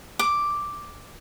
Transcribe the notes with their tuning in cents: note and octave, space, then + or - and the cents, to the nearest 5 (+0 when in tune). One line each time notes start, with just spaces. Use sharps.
D6 +0